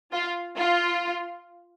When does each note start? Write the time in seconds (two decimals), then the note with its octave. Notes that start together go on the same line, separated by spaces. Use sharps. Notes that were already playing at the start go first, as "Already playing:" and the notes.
0.13 F4
0.57 F4